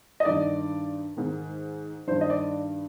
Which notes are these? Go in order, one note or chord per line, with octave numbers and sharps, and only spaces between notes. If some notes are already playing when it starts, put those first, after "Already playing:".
D#5
G2 D#3 D5
G#2 D#3
G2 D#3 C5
D#5
D5